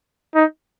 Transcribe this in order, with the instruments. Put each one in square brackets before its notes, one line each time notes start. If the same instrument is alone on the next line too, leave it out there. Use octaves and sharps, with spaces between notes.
[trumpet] D#4